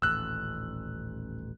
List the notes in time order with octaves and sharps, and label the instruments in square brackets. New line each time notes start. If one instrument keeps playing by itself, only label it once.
[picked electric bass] D#1 A1 [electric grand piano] E6 F#6